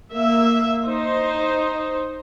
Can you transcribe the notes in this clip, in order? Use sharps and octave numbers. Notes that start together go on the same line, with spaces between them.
A#3 E5
D#4 C5